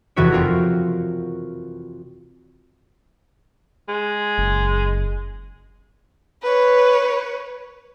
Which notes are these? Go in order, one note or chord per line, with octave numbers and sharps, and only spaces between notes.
F1 E2 E3 F#4 B4 C#5
C4 F4 F#4 A#4
G#3
F#1
B4 C#5